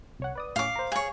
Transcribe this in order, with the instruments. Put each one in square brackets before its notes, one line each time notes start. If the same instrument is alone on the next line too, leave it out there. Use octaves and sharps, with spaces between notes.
[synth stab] C2 C#5 F#5
B4 D5 D#6
[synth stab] A2 C#4 [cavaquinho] F5 D6
[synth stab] A#4 C5
[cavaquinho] G#4 C#5 [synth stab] F5